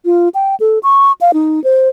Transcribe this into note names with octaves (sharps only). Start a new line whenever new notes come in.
F4
G5
A4
C#6
F5
D#4
C5